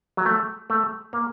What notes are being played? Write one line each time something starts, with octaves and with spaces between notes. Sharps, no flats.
F#3
A3
A3
A#3